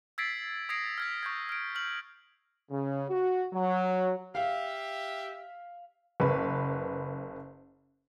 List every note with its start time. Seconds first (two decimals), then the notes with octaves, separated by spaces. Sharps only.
0.18 E6 G#6 A6 B6 C7 D7
0.69 D#6 G#6 A#6 C7 D7
0.98 F6 G#6 B6
1.23 C#6 G6 G#6
1.49 F6 D7
1.75 F6 G6 F#7
2.71 C#3
3.10 F#4
3.53 F#3
4.35 G4 E5 F5
6.20 F#1 B4